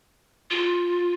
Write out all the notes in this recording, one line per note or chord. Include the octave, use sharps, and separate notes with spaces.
F4